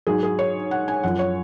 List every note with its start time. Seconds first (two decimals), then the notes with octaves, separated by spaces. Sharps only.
0.07 G#2 F#3 G#4
0.23 G#4
0.39 C#5
0.71 F#5
0.88 G#5
1.03 F#2 F3 F#5
1.19 C#5